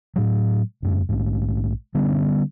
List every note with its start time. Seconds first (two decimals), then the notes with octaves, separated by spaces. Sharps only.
0.16 A2 F#3
0.82 E1 F#2 G#3
1.09 A#1 G#2
1.95 D3 G3 B3 C#4